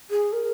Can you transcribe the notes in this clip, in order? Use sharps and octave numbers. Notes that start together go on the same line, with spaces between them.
G#4
A#4